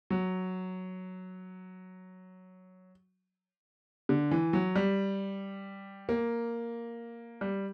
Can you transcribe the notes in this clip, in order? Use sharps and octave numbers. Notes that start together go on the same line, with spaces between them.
F#3
D3
E3
F#3
G3
A#3
G3